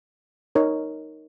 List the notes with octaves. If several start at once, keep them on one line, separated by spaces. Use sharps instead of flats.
D#4 A#4 C#5